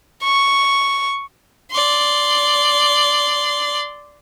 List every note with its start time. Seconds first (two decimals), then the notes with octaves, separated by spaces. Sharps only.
0.24 C#6
1.71 D5 C6